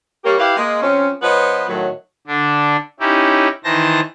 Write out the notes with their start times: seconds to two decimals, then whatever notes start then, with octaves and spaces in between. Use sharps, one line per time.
0.24 G3 A#3 G4 A#4 C#5
0.39 E4 G4 B4 F5
0.57 G#3 A#3
0.81 F3 C4 C#4
1.22 F3 B3 B4 C#5 D#5
1.68 A2 D#3 F#3
2.27 D3 D4
3.00 C#4 D#4 E4 G4
3.64 D#3 E3 C5 A5 A#6